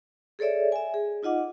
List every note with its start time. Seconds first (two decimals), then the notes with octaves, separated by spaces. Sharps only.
0.39 G#4 A4 C#5 D5 E5
0.72 E5 G#5
0.94 G#4
1.23 D#4 F4 D#5 F#5 D6